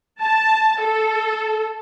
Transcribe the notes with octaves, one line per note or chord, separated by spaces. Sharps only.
A5
A4